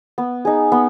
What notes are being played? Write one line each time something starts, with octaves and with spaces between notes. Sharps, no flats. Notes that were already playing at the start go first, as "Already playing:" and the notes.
B3
D#4 G#4
B3